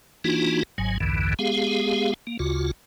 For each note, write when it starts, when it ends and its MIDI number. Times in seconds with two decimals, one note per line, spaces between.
0.24 0.63 52
0.24 0.63 58
0.24 0.63 62
0.24 0.63 63
0.24 0.63 65
0.24 0.63 66
0.78 0.98 32
0.78 0.98 44
0.78 0.98 54
0.78 0.98 80
1.00 1.34 35
1.00 1.34 40
1.00 1.34 43
1.00 1.34 50
1.00 1.34 52
1.39 2.14 56
1.39 2.14 59
1.39 2.14 67
1.39 2.14 68
1.39 2.14 77
2.27 2.37 58
2.39 2.71 38
2.39 2.71 49
2.39 2.71 65
2.39 2.71 66